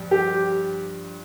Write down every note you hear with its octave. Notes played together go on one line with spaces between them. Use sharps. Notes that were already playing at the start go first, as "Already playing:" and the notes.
Already playing: G2 F3
G4